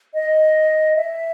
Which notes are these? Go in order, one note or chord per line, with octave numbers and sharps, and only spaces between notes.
D#5
E5